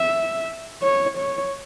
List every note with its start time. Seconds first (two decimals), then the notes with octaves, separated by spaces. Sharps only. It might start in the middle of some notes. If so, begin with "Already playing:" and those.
Already playing: E5
0.82 C#5
1.18 C#5